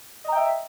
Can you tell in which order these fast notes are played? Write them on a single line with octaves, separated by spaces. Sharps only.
D#5 A#5 G5 E5